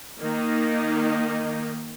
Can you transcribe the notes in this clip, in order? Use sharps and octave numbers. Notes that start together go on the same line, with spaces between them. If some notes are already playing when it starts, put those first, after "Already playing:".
D#3 A#3 D#4